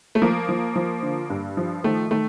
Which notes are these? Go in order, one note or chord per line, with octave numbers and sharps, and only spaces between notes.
A3
F3 A#3
F3
F3
D3
G2
F3
D#3 A3
D#3 A3